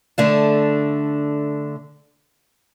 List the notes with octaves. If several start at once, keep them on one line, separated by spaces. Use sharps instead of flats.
D3 A3 D4